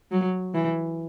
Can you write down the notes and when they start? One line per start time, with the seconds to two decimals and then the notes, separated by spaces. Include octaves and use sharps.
0.12 F#3
0.54 E3